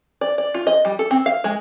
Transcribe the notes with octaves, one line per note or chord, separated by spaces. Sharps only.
D5
D5
F4
D#5
G3
A4
C4
F5
G#3